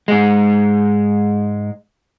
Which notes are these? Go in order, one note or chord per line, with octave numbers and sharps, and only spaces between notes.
G#2 G#3